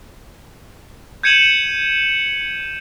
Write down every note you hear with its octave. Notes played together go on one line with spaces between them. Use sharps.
G6 G#6 C#7 D#7 E7 F#7